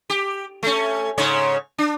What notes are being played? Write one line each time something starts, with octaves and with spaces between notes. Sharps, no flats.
G4
A3 C#4
G#2 C#3 C#5
D4